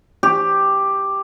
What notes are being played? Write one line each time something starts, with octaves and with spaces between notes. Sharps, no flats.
G4